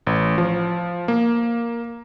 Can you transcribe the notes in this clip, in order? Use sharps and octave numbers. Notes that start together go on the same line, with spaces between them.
A1
F3
A#3